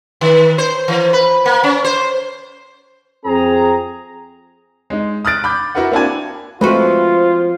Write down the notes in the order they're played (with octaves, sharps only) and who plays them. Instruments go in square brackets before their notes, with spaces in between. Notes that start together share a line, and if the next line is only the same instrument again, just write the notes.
[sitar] D#3
C5
E3
B4
A#3
C#4
C5
[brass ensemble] F2 C4 G#4 A#5
[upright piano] G#3 D#4
D#6 F6 F#6 A6 D7
B5 D6 G6
E4 F#4 A#4 B4 F#5
A#3 C4 D4 E4 F#4 G#5
[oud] F3 C4 F#4 [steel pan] G#3 A3 B4 [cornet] F4 [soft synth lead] C5